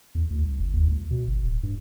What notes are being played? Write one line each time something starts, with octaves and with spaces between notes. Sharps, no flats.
E2
D2
C2
F#1
D#2
C#2
B2
G1
D1
G2